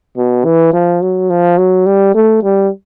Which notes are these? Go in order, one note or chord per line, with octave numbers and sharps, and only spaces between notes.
B2
E3
F3
F#3
F3
F#3
G3
A3
G3